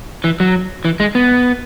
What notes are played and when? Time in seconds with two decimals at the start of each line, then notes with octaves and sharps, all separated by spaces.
0.24 E3
0.40 F#3
0.85 E3
1.00 G#3
1.15 B3